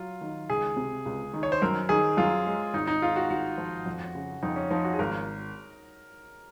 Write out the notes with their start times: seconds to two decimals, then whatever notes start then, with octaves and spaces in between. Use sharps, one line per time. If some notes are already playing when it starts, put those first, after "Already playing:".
Already playing: F#3 F4
0.21 D#3
0.50 C#2 G#4
0.76 C3
1.06 C#2
1.33 D#3
1.43 C#5
1.52 C5
1.62 F#2 A#4
1.89 D#3 G#4
2.17 F#2 F4
2.46 G#3
2.74 G#1 D#4
2.87 D#4
3.02 G#2 F4
3.16 F#4
3.30 G#1 F#4
3.58 F3
3.86 F2
4.15 C#3
4.42 F2 D#4
4.56 C#4
4.70 F3 D#4
4.85 F#4
4.93 G#4
4.99 G#1 A#4